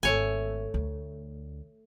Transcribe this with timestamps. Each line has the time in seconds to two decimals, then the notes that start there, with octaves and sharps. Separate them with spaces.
0.03 G#1 A3 C#5 G#5
0.74 D2